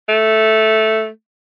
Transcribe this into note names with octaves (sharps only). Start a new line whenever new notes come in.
A3